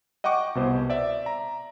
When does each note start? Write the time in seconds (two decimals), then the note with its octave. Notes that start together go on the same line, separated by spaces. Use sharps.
0.24 D#5 F#5 G5 C#6 D6
0.55 C2 B2 C5
0.90 D5 E5
1.26 A#5